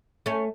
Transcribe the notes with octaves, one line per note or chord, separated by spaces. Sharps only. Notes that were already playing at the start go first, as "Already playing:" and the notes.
A3 C#4